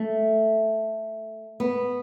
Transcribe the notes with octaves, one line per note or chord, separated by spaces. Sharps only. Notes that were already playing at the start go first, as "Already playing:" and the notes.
Already playing: A3
B3